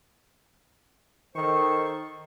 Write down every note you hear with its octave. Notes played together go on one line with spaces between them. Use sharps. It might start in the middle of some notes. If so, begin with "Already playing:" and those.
D#3 A4 C5 C#6